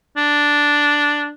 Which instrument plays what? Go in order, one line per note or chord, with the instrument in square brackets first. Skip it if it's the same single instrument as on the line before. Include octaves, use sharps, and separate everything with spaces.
[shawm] D4